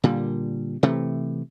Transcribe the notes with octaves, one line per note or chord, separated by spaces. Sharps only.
A#2 D3 G3
C3 E3 A3